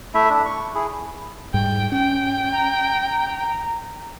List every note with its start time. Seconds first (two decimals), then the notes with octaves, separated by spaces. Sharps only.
0.14 A3 E4 E5
0.30 D4
0.46 C#6
0.75 E4 G#4
1.54 G#2 G3 G5
1.92 C#4 G5
2.52 A#5